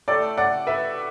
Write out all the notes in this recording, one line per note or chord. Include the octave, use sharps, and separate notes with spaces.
A2 A3 A4 D5
D5 F#5
B4 E5